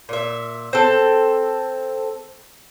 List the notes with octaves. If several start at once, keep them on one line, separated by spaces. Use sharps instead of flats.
A#2 E5
C4 A4